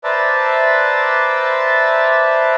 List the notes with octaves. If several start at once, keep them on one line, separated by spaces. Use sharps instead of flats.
B4 C5 D5 E5 A5 A#5